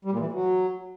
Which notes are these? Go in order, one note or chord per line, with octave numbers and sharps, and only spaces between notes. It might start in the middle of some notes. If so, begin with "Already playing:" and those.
G3
A#2
E3
A2
F#3